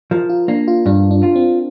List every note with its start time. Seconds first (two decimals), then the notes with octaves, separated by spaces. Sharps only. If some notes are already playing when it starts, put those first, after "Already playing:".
0.11 F3 A#4
0.29 F4
0.48 A#3 D4
0.68 F4
0.86 G2 D4
1.11 D4
1.23 F4
1.36 C4